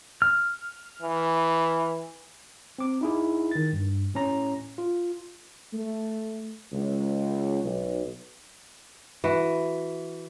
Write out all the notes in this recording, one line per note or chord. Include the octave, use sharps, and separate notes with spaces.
F6
E3
C4 D6
D#4 E4 G#4
D#3 A6
G2
A2 C#4 A#5
F4
A3
C#2
B1
E3 F#4